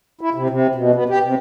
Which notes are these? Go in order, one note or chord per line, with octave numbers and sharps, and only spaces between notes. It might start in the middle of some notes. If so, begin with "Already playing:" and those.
E4
C3
C3
B2
B3
G4
C3